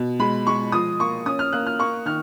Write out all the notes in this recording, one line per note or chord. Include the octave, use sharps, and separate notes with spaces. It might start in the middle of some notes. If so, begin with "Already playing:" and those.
Already playing: B2
G#3 B5
G#3 C#6
F3 D#6
A#3 C#6
C#4 D#6
F6
A#3 F#6
F6
A#3 C#6
D#3 F6